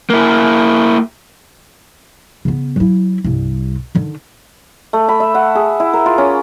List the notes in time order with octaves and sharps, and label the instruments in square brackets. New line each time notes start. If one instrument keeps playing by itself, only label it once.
[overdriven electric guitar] A#3 E4
[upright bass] C#3 B3
F#3 E4
C2 G2
D3 D#3
[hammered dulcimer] A3
B5
E5
F#5
G#4
E4
A#4
F4
C#4